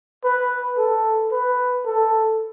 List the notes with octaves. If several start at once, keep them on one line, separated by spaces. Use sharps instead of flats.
B4
A4
B4
A4